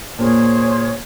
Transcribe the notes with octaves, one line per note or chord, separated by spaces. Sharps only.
A#2 G#4 C5 C#5